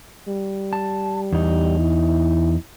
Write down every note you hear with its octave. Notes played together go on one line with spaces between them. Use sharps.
G3
A5
E2 D#4
E4